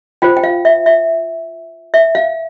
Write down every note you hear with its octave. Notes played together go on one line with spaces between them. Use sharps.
F4 C5 G5
G5
F5
E5
E5
E5
F5